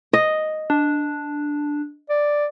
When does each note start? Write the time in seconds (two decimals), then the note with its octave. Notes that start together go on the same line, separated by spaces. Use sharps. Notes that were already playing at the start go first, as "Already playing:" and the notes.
0.13 D#5
0.70 D4
2.09 D5